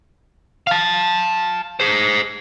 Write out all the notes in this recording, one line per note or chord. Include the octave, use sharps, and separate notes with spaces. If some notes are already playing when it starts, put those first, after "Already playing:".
F5 A5
G#4 C5